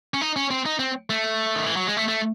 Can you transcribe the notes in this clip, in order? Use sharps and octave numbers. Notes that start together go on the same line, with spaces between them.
C#4
D#4
C#4
C4
D#4
C4
A3
D#3
E3
F#3
G#3
A3
A3